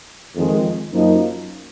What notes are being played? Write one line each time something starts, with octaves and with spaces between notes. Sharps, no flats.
F2 D#3 G#3
F#2 F3 A#3 D#4